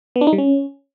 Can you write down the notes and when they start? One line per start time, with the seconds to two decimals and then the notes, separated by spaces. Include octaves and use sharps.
0.16 B3
0.21 D4
0.27 D#4
0.33 G3
0.38 C#4